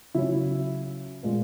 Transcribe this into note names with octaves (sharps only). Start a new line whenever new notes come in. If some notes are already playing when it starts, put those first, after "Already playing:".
C#3 F#3 C#4 E4
A#2 G#3 B3